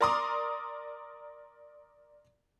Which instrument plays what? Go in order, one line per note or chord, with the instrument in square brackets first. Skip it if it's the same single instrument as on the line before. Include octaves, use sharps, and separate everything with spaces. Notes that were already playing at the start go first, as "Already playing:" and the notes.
[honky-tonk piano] A#4 D5 A#5 C6 D6 D#6